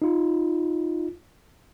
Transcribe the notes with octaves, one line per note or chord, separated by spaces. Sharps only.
D#4 F4